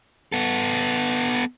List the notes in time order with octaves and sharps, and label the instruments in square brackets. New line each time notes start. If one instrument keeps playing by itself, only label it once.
[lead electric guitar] B3 A4